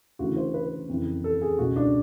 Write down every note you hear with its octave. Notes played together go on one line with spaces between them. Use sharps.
D2 C#3 E3 F#4
C5
B4
F2 C#3 E3
A4
G#4
C#2 B2 F#4
D4